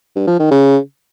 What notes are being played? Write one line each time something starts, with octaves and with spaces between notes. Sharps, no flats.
G2
F3
D#3
C#3